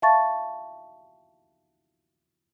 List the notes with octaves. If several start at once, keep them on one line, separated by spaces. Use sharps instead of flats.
E5 F5 A5 C#6 A6